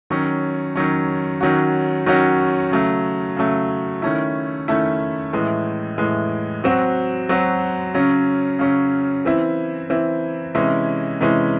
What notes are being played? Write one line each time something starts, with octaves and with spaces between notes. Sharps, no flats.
D#3 F#3 C#4
D#3 F#3 C#4
D#3 F#3 C#4 F#4
D#3 F#3 C#4 F#4
C#3 F#3 A3
C#3 F#3 A3
D#3 A3 C#4 E4
D#3 A3 C#4 E4
A2 E3 G#3
A2 E3 G#3
F#3 C4 F#4
F#3 C4 F#4
C#3 F#3 C#4
C#3 F#3 C#4
E3 C4 E4
E3 C4 E4
C3 E3 G#3 C#4 E4
C3 E3 G#3 C#4 E4